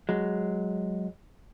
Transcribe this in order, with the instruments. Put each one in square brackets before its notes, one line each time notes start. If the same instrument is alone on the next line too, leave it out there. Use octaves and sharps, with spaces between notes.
[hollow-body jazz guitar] F#3 G#3